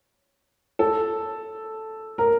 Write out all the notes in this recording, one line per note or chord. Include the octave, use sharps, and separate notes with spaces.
A4
A#4